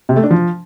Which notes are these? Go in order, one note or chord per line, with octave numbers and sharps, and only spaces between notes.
C3
A3
D4
F3